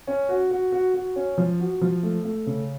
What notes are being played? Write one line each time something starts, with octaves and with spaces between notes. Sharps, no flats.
C#4
F#4
F#4
F#4
F#4
C#4
F3
F#4
F3
A3
A3
C#3